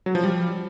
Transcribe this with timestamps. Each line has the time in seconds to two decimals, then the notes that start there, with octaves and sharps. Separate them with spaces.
0.06 F#3
0.15 F3
0.24 G3